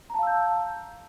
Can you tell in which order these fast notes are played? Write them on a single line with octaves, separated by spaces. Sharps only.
A#5 A5 F5 E6 G6